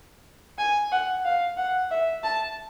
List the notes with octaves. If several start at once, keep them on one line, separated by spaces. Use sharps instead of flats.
G#5
F#5
F5
F#5
E5
A5